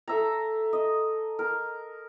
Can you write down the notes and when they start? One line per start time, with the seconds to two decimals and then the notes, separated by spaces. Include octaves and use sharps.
0.08 A4 E5 A#5
0.73 D#5
1.39 A#4